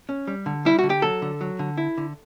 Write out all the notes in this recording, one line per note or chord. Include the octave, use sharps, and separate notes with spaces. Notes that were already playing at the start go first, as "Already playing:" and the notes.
C#4
G3
D3
G3 E4
D3 F#4
G4
F#3 A4
D3
F#3
D3
E4
D3